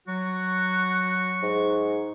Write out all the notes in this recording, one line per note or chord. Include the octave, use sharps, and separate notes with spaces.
F#3 F#4 C#6
G#2